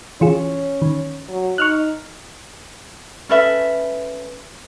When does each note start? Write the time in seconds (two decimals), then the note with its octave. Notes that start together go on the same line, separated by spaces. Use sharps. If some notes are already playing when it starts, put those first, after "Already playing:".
0.21 E3 C#4 F4 G#4
0.82 D#3
1.28 F#3
1.58 D#4 C#6 F6 F#6
3.29 C#4 A4 B4 E5